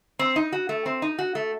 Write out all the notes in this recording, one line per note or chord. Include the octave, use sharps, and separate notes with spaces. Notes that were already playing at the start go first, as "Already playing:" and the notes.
C4
D#4
F#4
A3
C4
D#4
F#4
A3